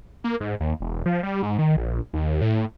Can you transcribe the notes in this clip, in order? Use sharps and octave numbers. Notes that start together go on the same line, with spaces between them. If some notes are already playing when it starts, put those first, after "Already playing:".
A#3
G#2
D#2
E1
F3
G3
G#2
D#3
A#1
D#2
A2